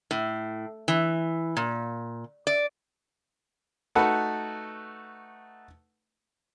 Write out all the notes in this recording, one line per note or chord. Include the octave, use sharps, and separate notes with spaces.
A2
E3
A#2
D5
A3 D#4 F#4 A4 B4 F#5